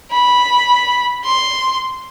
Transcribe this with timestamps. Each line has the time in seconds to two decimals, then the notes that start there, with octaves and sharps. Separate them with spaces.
0.12 B5
1.24 C6